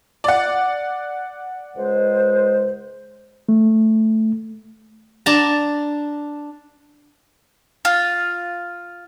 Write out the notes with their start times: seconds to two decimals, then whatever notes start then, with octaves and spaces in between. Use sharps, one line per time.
0.24 D5 F#5
1.76 C#2 G#3 C5
3.49 A3
5.26 D4 A5 A#5
7.85 F4